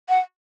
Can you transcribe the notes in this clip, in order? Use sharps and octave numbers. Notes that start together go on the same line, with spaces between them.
F#5